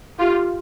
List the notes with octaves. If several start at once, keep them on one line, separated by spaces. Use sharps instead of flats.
F4 G4